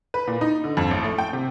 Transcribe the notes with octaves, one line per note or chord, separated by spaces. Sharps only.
B4
A#2
D#4
D3
F2
A1
A3
G5
C3